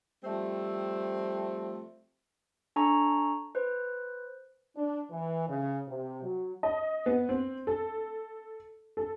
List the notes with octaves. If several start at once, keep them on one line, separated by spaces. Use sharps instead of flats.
F3 G3 A3 C4
D4 A4 G#5 A#5 C#6
B4 C5
D4
E3
C#3
C3
F#3
D#5
B3
C4
A4
A4